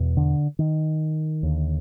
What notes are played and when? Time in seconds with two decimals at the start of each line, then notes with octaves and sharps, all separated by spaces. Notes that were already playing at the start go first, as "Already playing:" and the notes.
Already playing: E2 B2
0.17 D3
0.59 D#3
1.43 D#2 D3